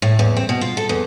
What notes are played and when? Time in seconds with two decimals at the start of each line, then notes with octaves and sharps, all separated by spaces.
0.02 A2
0.19 E2
0.37 C4
0.49 B2
0.61 F4
0.77 A4
0.89 E2